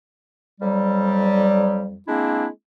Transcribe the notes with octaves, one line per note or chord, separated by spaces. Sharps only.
F2 F#3 G3
G#3 A#3 C4 D4 E4